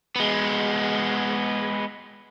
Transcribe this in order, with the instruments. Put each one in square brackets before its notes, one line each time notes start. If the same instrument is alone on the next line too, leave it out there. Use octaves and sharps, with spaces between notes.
[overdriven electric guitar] G#3 B3